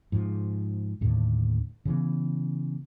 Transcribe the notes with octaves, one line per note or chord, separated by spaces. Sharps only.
G#2 F3
D#2 A2 D3
C#3 E3 B3